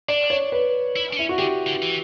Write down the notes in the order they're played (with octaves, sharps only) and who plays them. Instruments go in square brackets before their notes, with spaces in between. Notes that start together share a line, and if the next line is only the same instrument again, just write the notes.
[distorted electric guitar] D4 [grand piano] D5
[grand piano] C#5
B4
[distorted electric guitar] E4
D4
[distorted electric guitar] C#4 [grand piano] E4
[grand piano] F#4
[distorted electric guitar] D3 [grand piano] G4
[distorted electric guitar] D3
E3